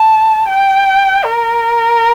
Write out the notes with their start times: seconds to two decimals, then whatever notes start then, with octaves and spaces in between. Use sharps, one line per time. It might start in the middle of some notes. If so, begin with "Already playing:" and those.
Already playing: A5
0.49 G5
1.24 A#4